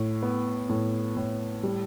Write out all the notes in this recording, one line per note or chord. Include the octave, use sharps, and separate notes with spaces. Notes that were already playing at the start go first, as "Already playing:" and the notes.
Already playing: A2
B3
A2
A2
G3